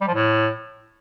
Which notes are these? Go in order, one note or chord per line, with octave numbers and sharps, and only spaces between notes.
G3
F3
A2